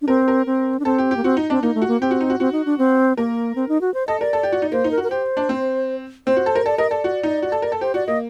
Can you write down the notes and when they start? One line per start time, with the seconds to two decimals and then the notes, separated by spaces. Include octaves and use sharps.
0.02 D4
0.07 C4 A#4
0.28 A#4
0.46 C4
0.80 D4
0.85 C4 A4
0.98 G4
1.11 G4
1.16 A#3
1.24 C4 F#4
1.37 D#4
1.50 C4 D4
1.62 A#3 D#4
1.75 A3
1.82 F#4
1.88 A#3
2.01 C4 G4
2.11 F#4
2.21 D#4
2.30 F#4
2.40 C4 F#4
2.52 D#4
2.66 D4
2.78 C4
3.17 A#3 A#4
3.56 C4
3.69 D#4
3.81 F#4
3.94 C5
4.07 A4 D#5
4.20 A#4 D5
4.33 A4
4.43 G4
4.52 F#4
4.62 D#4
4.72 A#3 C5
4.84 D#4
4.91 A#4
4.98 F#4
5.03 A#4
5.10 G4 C5
5.37 D4
5.49 C4
6.27 C4 C5
6.36 F#4
6.46 A4
6.55 A#4
6.65 A4 D5
6.78 A#4 D#5
6.90 A4 D5
7.04 F#4
7.23 D#4
7.42 F#4
7.52 A4
7.62 A#4
7.72 A4
7.81 G4 C5
7.94 F#4 D5
8.07 A#3 D#5